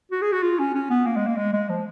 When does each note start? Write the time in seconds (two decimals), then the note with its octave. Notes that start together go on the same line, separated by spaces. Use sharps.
0.12 F#4
0.22 G#4
0.33 F#4
0.42 F4
0.59 C#4
0.75 C#4
0.90 B3
1.06 A#3
1.16 G#3
1.27 A#3
1.37 G#3
1.53 G#3
1.69 F3